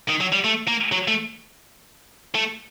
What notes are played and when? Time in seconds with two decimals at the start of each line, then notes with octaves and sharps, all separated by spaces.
0.08 D#3
0.20 F#3
0.32 G3
0.44 A3
0.68 A#3
0.92 F#3
1.08 A3
2.35 A3